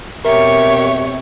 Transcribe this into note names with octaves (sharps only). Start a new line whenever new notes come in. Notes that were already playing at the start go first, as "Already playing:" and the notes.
F2 B2 G4 A#4 C#5 E5